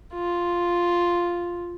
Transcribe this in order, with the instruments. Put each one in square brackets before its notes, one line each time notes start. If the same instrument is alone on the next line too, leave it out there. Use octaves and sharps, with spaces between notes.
[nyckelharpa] F4